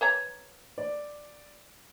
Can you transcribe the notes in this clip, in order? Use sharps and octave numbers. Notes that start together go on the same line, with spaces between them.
B4 C#5 A#5
D5